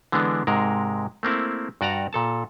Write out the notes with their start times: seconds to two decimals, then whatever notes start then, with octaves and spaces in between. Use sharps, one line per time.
0.12 D3 E3 G#3 B3 D4
0.47 G#2 C3 G#3 A#4
1.23 A3 A#3 C4 E4
1.81 G2 F#4 D5 F#5 A#5
2.13 A#2 A4 A5